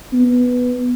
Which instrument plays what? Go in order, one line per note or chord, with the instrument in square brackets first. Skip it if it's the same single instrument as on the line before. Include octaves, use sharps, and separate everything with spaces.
[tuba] B3